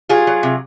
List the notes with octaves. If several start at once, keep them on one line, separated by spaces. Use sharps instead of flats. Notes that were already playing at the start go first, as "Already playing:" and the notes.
F#3 F4 G#4
F#3
C3